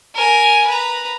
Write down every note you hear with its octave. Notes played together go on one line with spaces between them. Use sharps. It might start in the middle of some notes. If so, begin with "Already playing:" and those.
A#4 G#5
B4 A#5